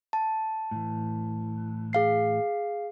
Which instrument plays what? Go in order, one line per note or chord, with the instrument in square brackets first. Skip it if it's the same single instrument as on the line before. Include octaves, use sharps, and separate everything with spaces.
[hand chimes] A5
[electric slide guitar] A2 E3
[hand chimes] G#4 F5 C7